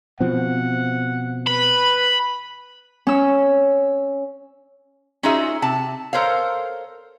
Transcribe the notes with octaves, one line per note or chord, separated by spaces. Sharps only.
B2 F3 C4 F#5
B4 B5
C#4 E6
C#4 D#4 F4 F#4 G#4 E5
C3 A5
A4 A#4 C5 C#5 F5